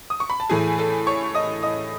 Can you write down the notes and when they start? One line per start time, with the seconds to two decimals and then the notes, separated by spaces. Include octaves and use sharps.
0.10 D#6
0.20 C#6
0.30 B5
0.40 A5
0.49 A2 E3 A3 G#4 G#5
0.78 A4 A5
1.07 C#5 C#6
1.35 D#5 D#6
1.63 D#5 D#6